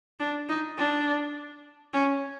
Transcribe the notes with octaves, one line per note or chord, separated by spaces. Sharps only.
D4
D#4
D4
C#4